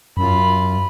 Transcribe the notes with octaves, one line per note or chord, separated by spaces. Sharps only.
F#2 F4 B5